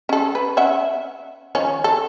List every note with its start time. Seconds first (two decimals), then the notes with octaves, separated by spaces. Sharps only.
0.09 C#4 A4
0.35 B4
0.57 C#4 E5 F#5
1.55 D#3 F3 C#4
1.84 A4